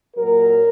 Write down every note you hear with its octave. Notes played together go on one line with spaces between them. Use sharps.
A#2 F#3 A#4